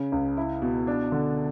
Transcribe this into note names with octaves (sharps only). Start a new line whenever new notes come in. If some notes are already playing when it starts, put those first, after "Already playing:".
Already playing: C#3
C#2
E4
B2
D4
D3